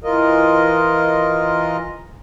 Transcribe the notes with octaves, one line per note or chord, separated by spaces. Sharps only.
E3 F4 A#4 D#5